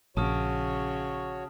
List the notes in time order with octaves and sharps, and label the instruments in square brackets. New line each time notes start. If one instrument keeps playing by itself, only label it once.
[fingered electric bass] A#1 [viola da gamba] C#3 [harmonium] F#4 C#5 [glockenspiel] A5 D#6 F6